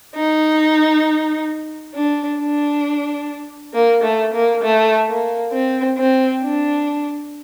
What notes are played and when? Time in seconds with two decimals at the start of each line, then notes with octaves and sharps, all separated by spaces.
0.15 D#4
1.95 D4
2.40 D4
3.73 A#3
4.03 A3
4.34 A#3
4.63 A3
5.08 A#3
5.52 C4
5.97 C4
6.42 D4